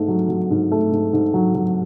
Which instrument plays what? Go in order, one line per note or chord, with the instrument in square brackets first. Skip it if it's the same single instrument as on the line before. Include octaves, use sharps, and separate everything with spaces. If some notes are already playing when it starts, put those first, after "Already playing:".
Already playing: [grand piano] G#2 A3
F#3
F#3
G#2
A3
G#2
G#2
F#3
F#3